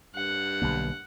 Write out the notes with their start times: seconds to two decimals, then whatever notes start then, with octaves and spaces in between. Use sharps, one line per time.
0.15 G2 F#5
0.62 B1 D3 A#3